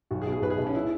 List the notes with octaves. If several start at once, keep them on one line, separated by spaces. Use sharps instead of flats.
B1 F#4
G#4
B2
G#4
B1 B4
G#4
B2
C#4
E4